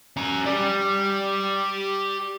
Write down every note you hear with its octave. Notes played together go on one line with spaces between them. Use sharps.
C#4 A#5
G4 D5